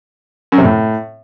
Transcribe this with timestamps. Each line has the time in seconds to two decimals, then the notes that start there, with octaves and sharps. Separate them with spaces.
0.52 F#2
0.58 C3
0.64 A2